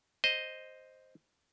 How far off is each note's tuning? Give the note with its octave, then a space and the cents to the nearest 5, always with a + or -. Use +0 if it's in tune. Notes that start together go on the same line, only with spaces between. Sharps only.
C5 +0 D#5 +0